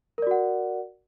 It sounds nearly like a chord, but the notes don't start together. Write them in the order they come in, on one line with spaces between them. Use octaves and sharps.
A#4 D5 F#4 F#5